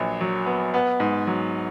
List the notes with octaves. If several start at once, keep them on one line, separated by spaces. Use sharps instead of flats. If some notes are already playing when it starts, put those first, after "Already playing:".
Already playing: A#1 A#2 F#3
F#3
B3
B3
G#2
F#3